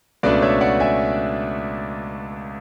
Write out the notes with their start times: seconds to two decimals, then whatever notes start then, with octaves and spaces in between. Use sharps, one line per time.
0.23 C#2 B2 A3 D4 B4 D5
0.42 C#5 E5
0.61 D5 F#5
0.80 E5 G#5